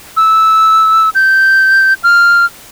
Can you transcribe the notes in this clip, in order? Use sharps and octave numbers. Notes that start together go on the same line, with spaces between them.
E6
G6
F6